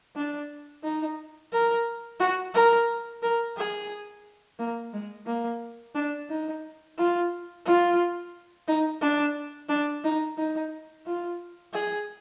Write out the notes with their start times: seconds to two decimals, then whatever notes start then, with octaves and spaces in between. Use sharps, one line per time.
0.16 D4
0.84 D#4
1.53 A#4
2.20 F#4
2.54 A#4
3.23 A#4
3.57 G#4
4.59 A#3
4.93 G#3
5.26 A#3
5.95 D4
6.30 D#4
6.98 F4
7.66 F4
8.68 D#4
9.01 D4
9.69 D4
10.04 D#4
10.38 D#4
11.06 F4
11.74 G#4